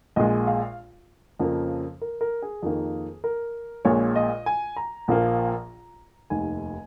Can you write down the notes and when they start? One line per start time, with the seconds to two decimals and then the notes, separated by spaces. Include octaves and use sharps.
0.16 A#1 A#2 G#3 D#5
0.47 F5
1.39 F2 C#3 F3 A#3
2.01 A#4
2.21 A#4
2.42 G#4
2.63 F2 D#3 A#3
3.24 A#4
3.85 A#1 A#2 G#3 C#5
4.16 D#5
4.46 G#5
4.76 A#5
5.08 A#1 A#2 F3 A#3
6.30 F1 D#2 D#3 G#5